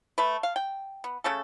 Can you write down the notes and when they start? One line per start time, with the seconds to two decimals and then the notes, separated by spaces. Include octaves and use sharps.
0.18 A3 B4
0.43 F5
0.56 G5
1.04 B3
1.24 C#3 A3 C#4 A4